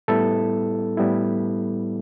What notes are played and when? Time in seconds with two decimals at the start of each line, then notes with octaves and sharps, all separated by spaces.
0.08 A2 G3 B3 E4 A4
0.97 A2 G3 B3 E4